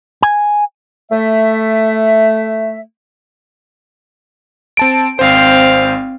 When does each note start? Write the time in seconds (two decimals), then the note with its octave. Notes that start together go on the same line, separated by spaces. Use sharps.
0.22 G#5
1.12 A3 E5
4.77 C4 A5 D7
5.19 G#1 C4 C5 F5